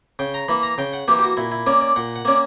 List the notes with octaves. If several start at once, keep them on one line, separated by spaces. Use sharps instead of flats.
C#3 G5
A#5
E3 A#3 B5
A#5
C#3 G5
F#5
E3 A#3 G4
G4
F#4
A#2 E4
E4
A#3 C#4 D5
D5
A#2 F#5
F#5
A#3 C#4 D5